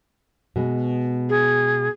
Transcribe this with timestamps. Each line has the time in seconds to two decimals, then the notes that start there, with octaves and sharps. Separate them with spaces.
0.56 B2 G#3
1.29 G#4